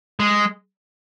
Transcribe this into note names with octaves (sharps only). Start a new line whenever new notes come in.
G#3